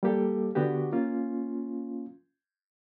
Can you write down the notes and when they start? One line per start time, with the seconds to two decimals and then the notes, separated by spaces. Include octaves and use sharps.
0.03 G3 A#3 G4 A4
0.55 D3 B3 F#4 G4
0.93 A#3 C#4 F4